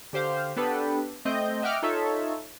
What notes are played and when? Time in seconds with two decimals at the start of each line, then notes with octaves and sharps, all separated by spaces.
0.13 D3 G4 C5 F5
0.56 B3 D4 G4 A4 B4
1.25 A3 C4 D#5 G6
1.62 D#5 E5 F#5 G5 D6 F6
1.82 D#4 F4 A4 C#5 E5